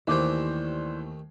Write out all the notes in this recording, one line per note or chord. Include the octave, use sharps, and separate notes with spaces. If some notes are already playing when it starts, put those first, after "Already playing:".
D#2 D#3 E3 A3 G4 C5 D5